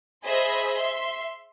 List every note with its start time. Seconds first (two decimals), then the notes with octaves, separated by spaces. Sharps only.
0.23 G#4 C5 D#5 E5 B5
0.77 E5 C6